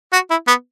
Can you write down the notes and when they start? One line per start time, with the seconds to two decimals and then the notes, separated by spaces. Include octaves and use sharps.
0.13 F#4
0.30 E4
0.48 B3